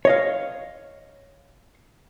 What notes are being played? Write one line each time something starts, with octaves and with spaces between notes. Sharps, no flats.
C#5 D#5 F5